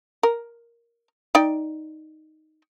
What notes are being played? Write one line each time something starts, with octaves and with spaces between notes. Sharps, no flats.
A#4
D#4 D5 G5